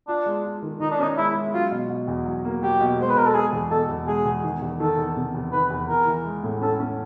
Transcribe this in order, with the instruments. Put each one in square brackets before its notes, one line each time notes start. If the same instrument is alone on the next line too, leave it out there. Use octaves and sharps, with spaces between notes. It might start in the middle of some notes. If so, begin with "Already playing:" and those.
[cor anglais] D4 [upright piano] F4
[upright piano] G#3
F4
D#3
[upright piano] D#3 [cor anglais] D#4
[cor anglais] D4
[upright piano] C#4 [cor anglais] D#4
[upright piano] G#3 [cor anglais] E4
[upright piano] G#3
[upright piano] F#3 [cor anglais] F4
[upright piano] B2
B2
E2
F#3
A#3
[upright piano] F#3 [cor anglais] G4
[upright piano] B2
[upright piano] G#3 [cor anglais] C5
[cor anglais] B4
[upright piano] B2 [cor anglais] A#4
[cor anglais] A4
[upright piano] G#3 [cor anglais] G#4
[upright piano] E2
[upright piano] B2 [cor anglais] A4
[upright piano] E2
[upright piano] G#3 [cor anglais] G#4
[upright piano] E2
D#3
E2
[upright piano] D#3 [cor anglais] A4
[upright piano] E2
C3
E2
[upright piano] D#3 [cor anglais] B4
[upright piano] E2
[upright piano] E3 [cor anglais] A#4
[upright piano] E3
G#3
A2
[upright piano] C#4 [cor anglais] A4
[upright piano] C#4